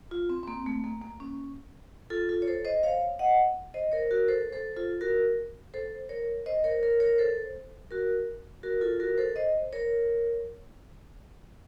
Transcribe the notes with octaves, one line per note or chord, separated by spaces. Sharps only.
F4
C4
C4
A#3
A3
A#3
A#3
C#4
F4 A4
F4 A4
C#5
A4 C5
C5 D#5
C#5 F5
D#5 F#5
C5 D#5
A#4 C#5
F#4 A#4
A4 C5
A4 C5
F4 A4
F#4 A#4
A4 C5
A#4 C#5
C5 D#5
A#4 C#5
A#4 C#5
A#4 C#5
A4 C5
F#4 A#4
F#4 A#4
F4 A4
F#4 A#4
A4 C5
C5 D#5
A#4 C#5